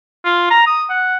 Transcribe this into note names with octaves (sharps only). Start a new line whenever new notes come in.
F4
A#5
D#6
F#5